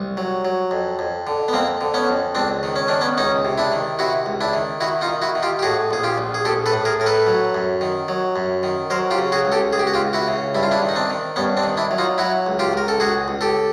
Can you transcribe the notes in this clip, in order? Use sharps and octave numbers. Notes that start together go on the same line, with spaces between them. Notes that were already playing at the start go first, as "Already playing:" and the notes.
Already playing: C2
F#3
F#3
F2
F2
D3
B3
F2 A#3 C4
D3
B3 C#4
F2
C#2 C4 D4
D#3
C#4
D#3 D4
B3 C#4
C#2 C#4 D#4
C3
D4 E4
D#3
C3 E4 F#4
C#2
D4 E4
D#3
D#3 E4 F#4
D#4 F4
D#3
E4 F#4
D#3
F4 G4
G4
A2 F#4 G#4
A#1 G#4
F4 G4
A#1
G#4
A#1 G4 A4
A4 B4
A2
G#4 A#4
A2 A#4
A4 B4
F#3
F#2
D#3
F#3
F#2
D#3
F#3 A#4 C5
F4 G4
C#3
F#4 G#4
C#2
G4 A4
C#2 G#4
G4
F#4
F4 G4
C#2
E4 F#4
C#3
G2 E4
F4
D4 E4
D#3
D#4
C4 D4
D#3
G2 B3 C#4
C4 D4
D#3
D4 E4
F#3
D#4 F4
F#3 E4 F#4
C#2
F4 G4
C#2 A#4
A4
C#2 F#4 G#4
C#2
G4 A4